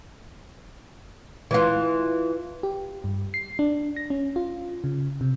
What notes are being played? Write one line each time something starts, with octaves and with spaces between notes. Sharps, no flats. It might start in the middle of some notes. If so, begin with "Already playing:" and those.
E3 F4
G4
G2
C7
D4
A#6
C#4
F4
C#3
C3